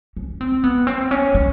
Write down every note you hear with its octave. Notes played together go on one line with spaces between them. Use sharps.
C#4
C4
B3
C4
C#4
C#4